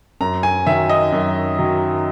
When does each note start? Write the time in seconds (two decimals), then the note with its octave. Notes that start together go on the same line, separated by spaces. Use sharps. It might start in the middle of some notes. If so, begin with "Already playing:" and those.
0.21 F#2 A#5
0.43 G#5
0.67 D#3 F#3 E5
0.89 D#5
1.12 F#2
1.58 D#3 F#3